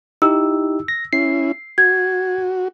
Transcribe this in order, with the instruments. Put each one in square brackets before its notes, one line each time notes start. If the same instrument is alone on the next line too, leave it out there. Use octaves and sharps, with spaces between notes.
[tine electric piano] D#4 E4 G4 [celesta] E6
[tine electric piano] A#6
[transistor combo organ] C#4 E4 [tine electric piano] C7
[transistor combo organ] F#4 [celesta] G#6